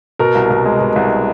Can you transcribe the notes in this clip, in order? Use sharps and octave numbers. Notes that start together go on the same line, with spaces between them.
B2 A#4
C2
C2
G#3
B2
C2